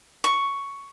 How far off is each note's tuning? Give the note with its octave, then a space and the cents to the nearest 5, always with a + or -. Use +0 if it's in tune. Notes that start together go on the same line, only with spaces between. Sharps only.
C#6 +5